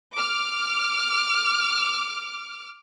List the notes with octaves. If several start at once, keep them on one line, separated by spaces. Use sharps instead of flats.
D6 F6